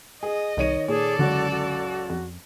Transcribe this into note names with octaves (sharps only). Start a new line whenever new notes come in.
G#4 D#5
C2 D#3 C#5 D#7
A#2 G#4 A4 D5
F#1 C#2 D3 F#4
F#4
F2